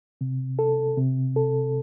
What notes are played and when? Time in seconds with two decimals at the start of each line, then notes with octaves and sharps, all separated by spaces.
0.21 C3
0.59 A4
0.97 C3
1.36 A4